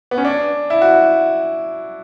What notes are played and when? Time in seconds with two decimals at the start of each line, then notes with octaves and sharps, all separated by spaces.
0.11 B3
0.18 C#4
0.25 D4
0.70 E4
0.82 F#4